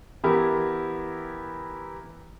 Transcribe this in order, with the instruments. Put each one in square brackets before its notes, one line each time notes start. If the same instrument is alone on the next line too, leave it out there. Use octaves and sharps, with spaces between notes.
[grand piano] E3 B3 E4 G4 A#4